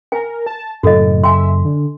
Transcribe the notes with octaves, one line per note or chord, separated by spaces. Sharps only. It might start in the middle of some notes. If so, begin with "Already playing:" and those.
A#4 G#5
A5
F#2 A2 C#3 F#3 F#4 A4 D#5
E5 G#5 C6
D3